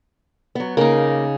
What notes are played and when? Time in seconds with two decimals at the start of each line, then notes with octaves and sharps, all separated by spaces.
0.55 F#3 B3
0.77 C#3 A#3 D#4 F4 A#4